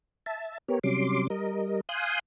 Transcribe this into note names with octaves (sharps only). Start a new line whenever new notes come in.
E5 A5
B3 G4 A#4 C#5
C3 F#3 G3 C#4 C6 D6
G3 A#4 D#5
F5 G#5 C6 D#6 F#6 G6